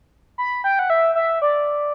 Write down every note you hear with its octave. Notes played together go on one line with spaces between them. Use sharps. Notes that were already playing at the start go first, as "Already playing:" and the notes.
B5
G5
F#5
E5
E5
D5